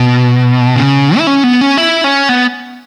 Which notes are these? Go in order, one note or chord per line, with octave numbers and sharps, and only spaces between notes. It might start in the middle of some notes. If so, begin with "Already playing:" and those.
Already playing: B2
C#3
E4
C#4
B3
C#4
E4
C#4
B3